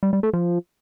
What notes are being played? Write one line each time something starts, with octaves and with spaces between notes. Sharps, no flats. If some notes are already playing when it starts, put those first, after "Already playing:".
G3
G3
A3
F3